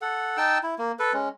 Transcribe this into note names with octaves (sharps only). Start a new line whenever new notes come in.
A4 F#5
D#4 G5 A5 E6
E4
A#3
A4 B4
G#3 C#4